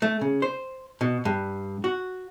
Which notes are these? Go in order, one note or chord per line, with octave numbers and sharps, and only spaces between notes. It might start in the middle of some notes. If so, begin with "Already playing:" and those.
A3
C#3
C5
B2
G2
F#4